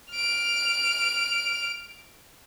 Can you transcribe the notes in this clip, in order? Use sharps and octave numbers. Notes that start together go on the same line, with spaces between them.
F6 D7